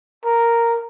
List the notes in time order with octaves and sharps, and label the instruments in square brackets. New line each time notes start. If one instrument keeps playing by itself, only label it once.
[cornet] A#4